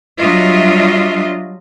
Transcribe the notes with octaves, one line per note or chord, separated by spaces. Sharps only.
F#3 G3 D4 F4 D#5 E5